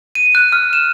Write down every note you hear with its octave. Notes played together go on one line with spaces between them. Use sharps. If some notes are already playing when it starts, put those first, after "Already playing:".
D#7
F#6
F6
E7